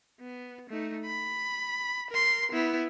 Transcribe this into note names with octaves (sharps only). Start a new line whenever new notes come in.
B3
A3 D#4
B5
A#4 C6
B3 E4